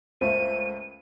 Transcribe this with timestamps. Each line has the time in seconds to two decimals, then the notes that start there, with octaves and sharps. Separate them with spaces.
0.21 C#2 A3 A#3 C5 D#7